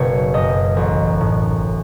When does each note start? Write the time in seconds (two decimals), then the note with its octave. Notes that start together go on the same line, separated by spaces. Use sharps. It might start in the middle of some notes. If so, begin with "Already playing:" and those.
Already playing: F#1 B2 B4 C#5
0.34 F#2 D#5
0.76 A1
1.21 A2